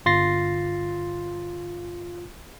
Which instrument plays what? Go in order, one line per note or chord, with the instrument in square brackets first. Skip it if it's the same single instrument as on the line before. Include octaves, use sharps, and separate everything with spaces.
[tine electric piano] G1 F4 C6 A6 A#6 C7